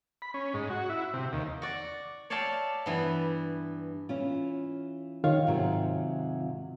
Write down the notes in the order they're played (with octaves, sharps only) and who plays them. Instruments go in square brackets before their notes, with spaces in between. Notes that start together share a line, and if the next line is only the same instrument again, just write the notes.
[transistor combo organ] B5
C#4
G#2
F#4
E4
C3
D#2
[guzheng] F#4 D5
C#5 D5 E5 F5 G5 A5
G2 E3 B3
[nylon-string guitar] E3 C#4 F4
[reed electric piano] D#3 F4 F5 [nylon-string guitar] C#5
[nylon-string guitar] G#2 C3 F#3